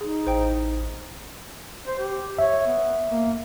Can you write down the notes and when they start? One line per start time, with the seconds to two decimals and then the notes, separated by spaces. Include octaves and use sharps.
0.01 D#4 G#4
0.27 A1 C5 G5
1.87 C5
1.99 G4
2.38 C#5 E5
2.67 B3
3.09 A#3